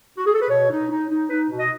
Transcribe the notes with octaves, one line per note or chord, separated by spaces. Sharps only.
F#4
G#4
A4
B4
B2 C#5
D#4
D#4
D#4
D#4 B4
B2
D#5